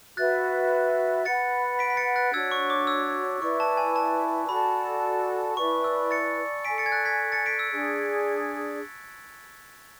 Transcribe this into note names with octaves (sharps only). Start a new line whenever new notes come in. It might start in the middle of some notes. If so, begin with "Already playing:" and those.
F#4 B4 E5 F#6 A6
B4 F#5 B5 A6 C#7
B6 D7
B6
A6 C#7
F#6 A6
D4 F#4 C#5 E6 G#6
C#6
D6
E6
E4 B4 D5 C#6
A5
G#5
A5
F#4 A4 D5 A5 B5
E4 B4 D5 C#6
E6
A6 C#7
A4 D5 G#5 B6 D7
A6 C#7
G#6
F#6 A6
G#6 B6
A6 C#7
B6 D7
E6
D4 G#4 D5